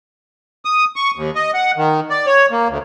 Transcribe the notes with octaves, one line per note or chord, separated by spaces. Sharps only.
D#6
C#6
D#2
D#5
F#5
D#3
D5
C#5
A#3
D2